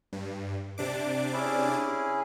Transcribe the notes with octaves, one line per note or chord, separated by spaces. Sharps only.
G2
C3 D4 D6
C#4 E4 G#4